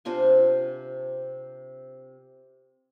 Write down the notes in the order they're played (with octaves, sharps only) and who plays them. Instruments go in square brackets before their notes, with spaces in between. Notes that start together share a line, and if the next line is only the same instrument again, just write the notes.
[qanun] C3 D4 F4 G#5